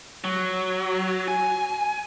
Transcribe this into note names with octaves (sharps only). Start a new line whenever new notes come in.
F#3
G#5